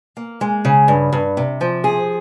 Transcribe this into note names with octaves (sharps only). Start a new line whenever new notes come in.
A#3
G#3
C#3
G2
G2
C3
F3
G#4